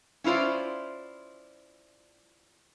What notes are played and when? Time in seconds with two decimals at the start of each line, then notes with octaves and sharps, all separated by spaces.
0.24 C#4 E4 F4 C5 D5